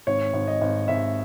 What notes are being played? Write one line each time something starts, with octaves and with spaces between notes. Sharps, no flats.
G#1 C#5
G#1
D#5
G#1
G#1 E5